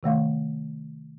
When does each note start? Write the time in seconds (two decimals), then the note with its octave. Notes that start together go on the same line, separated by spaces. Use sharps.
0.03 C3 D#3 A3 F5